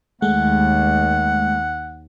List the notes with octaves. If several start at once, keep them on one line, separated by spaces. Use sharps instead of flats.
D#2 G#3 A3 F#5